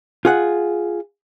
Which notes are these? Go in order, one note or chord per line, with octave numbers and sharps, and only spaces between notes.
F4 G#4 F#5